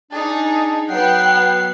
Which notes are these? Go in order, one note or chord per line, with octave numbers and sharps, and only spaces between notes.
D4 D#4 G#4 A5
F#3 B3 F#5 G5 C7